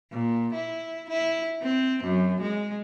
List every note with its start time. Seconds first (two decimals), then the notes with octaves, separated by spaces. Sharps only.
0.12 A#2
0.54 E4
1.10 E4
1.62 C4
2.04 F#2
2.42 G#3